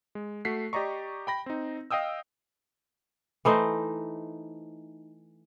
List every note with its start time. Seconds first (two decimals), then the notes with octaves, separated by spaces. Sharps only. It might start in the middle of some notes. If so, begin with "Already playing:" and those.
0.15 G#3
0.45 A3 F#4 B6 C7
0.73 G4 D5 D#5 A#5 C#6
1.27 G5 B5 A#6
1.46 C4 D#4
1.91 D#5 F5 G5 D#6 E6
3.45 E3 A3 D#4 C5